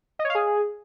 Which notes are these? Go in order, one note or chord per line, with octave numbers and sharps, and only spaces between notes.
D#5
C#5
F5
G#4